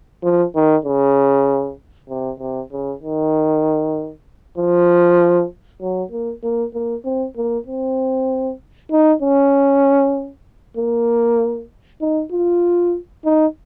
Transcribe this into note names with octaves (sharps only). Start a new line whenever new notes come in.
F3
D#3
C#3
C3
C3
C#3
D#3
F3
F#3
A#3
A#3
A#3
C4
A#3
C4
D#4
C#4
A#3
D#4
F4
D#4